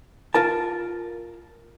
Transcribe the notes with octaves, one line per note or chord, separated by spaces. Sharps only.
F4 A#4 A5